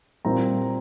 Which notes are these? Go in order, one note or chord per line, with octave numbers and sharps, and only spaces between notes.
A#2 G3 C4 A#5